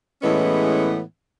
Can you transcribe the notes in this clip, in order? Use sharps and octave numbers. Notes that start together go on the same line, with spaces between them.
A2 E3 G#3 B3 C#4